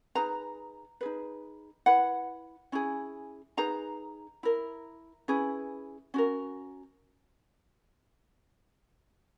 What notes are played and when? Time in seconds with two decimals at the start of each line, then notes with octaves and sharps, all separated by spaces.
0.15 D#4 G#4 B4 A#5
1.01 D#4 G#4 B4
1.86 E4 B4 F#5
2.72 C#4 E4 G#4
3.57 D#4 G#4 B4 A#5
4.43 E4 A#4
5.28 C#4 E4 G#4 B4
6.14 C#4 F#4 A#4